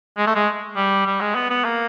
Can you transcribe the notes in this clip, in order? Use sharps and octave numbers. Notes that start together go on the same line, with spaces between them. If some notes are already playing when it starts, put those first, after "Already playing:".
G#3
A3
G#3
G3
G3
G#3
B3
B3
A#3